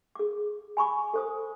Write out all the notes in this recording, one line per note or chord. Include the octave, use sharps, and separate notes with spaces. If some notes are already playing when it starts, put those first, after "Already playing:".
G#4 D6
G#5 B5 C#6 D6
A4 C5 D#6